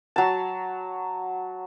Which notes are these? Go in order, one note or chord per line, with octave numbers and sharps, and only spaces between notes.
F#3 A5